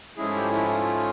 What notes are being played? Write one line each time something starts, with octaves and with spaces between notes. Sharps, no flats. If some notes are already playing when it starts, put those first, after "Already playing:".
G#2 F3 G#3 A3 C#4 E4 G#4
G3 G4
E4
F4